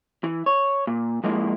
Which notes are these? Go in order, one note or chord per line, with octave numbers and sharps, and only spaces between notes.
E3
C#5
A#2
F3 G#3 A#3 E4